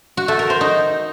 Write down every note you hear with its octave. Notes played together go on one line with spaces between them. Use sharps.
F#4
A3
A#4
C5
D#4